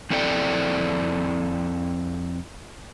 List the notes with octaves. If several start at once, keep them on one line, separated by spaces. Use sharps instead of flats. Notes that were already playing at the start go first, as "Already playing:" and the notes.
F2 C4 E4 A4 D5 G5